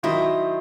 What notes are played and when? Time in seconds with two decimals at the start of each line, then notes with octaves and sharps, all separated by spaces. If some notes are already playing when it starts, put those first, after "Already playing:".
0.03 D#3 F#3 E4 C5 D#5